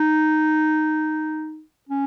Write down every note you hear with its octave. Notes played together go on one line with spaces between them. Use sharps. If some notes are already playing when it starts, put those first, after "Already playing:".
Already playing: D#4
C#4